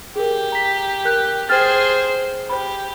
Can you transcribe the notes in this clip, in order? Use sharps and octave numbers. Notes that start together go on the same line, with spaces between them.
G4 G#4 A#4
A#5 B6
A#4 F#6 G6
G#4 C5 G5 F6 A6
G4 C5 B5